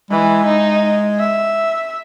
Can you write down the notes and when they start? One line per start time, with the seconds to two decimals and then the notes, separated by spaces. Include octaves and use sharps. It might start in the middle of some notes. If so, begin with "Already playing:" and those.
0.11 E3 G#3
0.45 D#4
1.20 E5